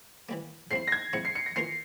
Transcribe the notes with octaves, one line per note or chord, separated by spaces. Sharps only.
E3 G3 A#3
G#2 F3 C4 E4 C7
A#6
G#6
G#2 F3 C4 E4 C#7
C7
C#7
A#6
E3 A#3 F4 A#4 C7